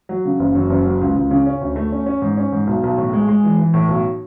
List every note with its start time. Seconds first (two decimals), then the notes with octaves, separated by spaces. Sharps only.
0.09 F#3
0.25 C#3
0.39 F#1
0.55 F#2
0.70 F#1
0.86 F#3
1.01 C#2
1.16 C#2
1.31 C#3
1.47 C#4
1.61 D2
1.76 A3
1.92 C#4
2.06 C#4
2.22 G#2
2.37 C#4
2.52 G#2
2.67 B1
2.83 B1
2.98 A2
3.13 G#3
3.29 G#3
3.44 E3
3.59 E3
3.74 A2
3.89 B1